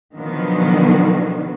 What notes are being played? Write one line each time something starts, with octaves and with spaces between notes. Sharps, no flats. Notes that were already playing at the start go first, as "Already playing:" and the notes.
B2 D3 D#3 F3 F#3 B3